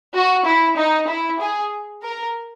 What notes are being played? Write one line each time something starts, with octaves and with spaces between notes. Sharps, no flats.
F#4
E4
D#4
E4
G#4
A#4